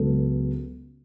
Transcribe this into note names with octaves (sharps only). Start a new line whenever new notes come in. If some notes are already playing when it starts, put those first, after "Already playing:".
Already playing: C#2 C#3 F#3 B3 A4